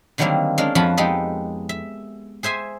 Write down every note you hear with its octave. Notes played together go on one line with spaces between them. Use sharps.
D3 D#3 F#3 G3 A#3 C4
G#3 C#4 D4 A#4
F2 F3 F4 F#4 A5 B5
G#3 B3 D#4 G4 A4
E5
G#4 C5 E5 G#5